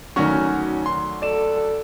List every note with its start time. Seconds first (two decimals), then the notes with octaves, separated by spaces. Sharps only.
0.16 D2 D#3 F#3 C#4 F#4 G#5 C#6
0.86 C6
1.22 A4 D5 E7